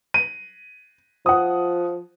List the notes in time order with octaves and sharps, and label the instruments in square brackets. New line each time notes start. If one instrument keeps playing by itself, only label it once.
[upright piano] D#7
[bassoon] F3 [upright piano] F#5 D#6